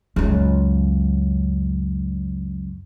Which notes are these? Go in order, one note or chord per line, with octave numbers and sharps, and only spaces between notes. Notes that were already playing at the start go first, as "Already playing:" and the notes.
C#2 F#2